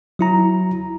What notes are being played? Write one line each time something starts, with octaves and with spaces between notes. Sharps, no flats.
F#3 E4 A#5